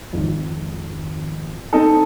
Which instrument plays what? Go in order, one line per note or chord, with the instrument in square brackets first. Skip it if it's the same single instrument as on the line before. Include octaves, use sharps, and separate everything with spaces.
[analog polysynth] G#1 F2
[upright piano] C4 D#4 A4